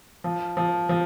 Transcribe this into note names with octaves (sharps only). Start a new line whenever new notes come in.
F3
F3
F3